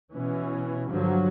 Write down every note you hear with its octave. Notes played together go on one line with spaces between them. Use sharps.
B2 E3 C#4
G2 D3 F3 F#3